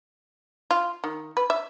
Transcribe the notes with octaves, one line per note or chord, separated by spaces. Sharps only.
F4
D#3
B4
E5